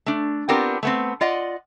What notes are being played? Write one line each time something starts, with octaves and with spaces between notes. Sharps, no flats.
A3 D4
B3 C4 D4 F4 G4 A#4
A3 B3 C4
F4 D5 D#5 F#5